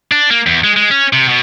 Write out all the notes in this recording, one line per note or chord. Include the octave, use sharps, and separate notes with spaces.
D4
A#3
E2
G#3
G#3
C#4
C3
B2